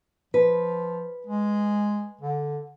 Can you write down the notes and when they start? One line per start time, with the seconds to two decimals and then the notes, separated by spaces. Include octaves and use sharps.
0.34 F3 B4
1.26 G#3
2.21 D3